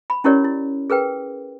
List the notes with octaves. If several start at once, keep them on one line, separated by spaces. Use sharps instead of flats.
B5
C#4 E4 G4 A#4 C#5 D5
E4
G#4 A#4 B4 G5